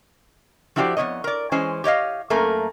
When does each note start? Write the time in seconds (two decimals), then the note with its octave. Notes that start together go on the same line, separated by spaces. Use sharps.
0.76 F3 E4 F#4 G4 C5 D5
0.97 F2 F3 B3 C#5 D#5
1.24 A#4 D5
1.52 E3 G#3 C#4 C5 G#5
1.84 G4 C#5 D#5 F5
2.30 F#2 A3 A#3 A#4 G#5